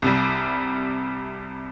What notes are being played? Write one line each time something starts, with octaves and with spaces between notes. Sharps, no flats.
C2 C3 G3